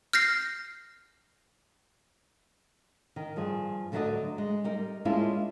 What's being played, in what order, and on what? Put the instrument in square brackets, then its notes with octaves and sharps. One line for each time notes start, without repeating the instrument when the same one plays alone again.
[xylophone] F6 G6 A#6 C7
[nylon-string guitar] D#3
G2 F3 G#4
D2 D3 F#3 B4 D5 D#5
G#3
G3 D#4 A#4
G#3 A#3 C#4 D4 E4 F4